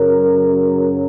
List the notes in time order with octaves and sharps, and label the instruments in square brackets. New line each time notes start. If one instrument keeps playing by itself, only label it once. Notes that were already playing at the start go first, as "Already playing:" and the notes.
Already playing: [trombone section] F#2 C#3 F#3 A#4